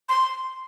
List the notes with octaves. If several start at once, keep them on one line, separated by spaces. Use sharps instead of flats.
C6